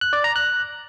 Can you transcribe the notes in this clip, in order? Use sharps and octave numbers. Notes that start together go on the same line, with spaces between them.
F#6
D5
A#5
F#6